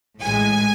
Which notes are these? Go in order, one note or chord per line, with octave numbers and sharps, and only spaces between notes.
A1 A2 G#3 G#5